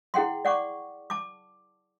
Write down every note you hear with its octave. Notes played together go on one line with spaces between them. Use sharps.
E4 G#4 F#5 G5 C6
D5 F#5 C#6 D6
A5 D6